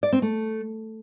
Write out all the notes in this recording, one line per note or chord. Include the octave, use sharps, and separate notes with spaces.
D5
C4
A3